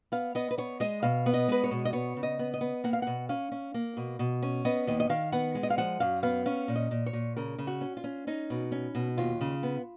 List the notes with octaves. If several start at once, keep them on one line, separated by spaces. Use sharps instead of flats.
B3 F5
B3 D#5
B4
B3 C#5
G#3 D#5
B2 F5
B3
D#5
G#3 B4
C#5
B2
D#5
B3 C#5
C#3
D#5
B3
D#5
B3
A#3 F#5
F5
B2 F#5
C#4 F5
C#4
A#3
B2
B2
C#4
B3 D#5
D#2 D#5
D#5
D#3 F5
B3 F#5
G#3
D#5
F5
F3 F#5
F#2 F5
B3 F5
C#4 F5
A#2
D#5
A#2
C#5
A#2
C#3 A#4
C#3
F#4
C#4
F4
C#4
C#4 D#4
B2
C#4
B2
D#2 F4
C#3
B3